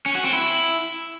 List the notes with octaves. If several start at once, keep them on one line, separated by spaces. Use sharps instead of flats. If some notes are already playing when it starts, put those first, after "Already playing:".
C#4
F#4
C4
E4